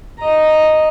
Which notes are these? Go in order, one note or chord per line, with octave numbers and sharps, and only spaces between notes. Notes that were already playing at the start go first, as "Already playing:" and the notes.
D#5 A#5